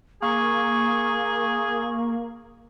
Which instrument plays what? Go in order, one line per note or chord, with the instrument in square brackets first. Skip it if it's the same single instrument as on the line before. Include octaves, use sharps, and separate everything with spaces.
[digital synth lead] A#3 [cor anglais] G#4 [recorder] C#6